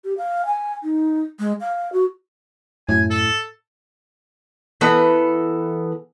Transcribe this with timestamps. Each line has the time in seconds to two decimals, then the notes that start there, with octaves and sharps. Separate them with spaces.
0.04 G4
0.18 F5
0.46 G#5
0.83 D#4
1.39 G#3
1.61 F5
1.93 F#4
2.89 F#2 A2 G#5
3.10 A4
4.81 E3 B3 A4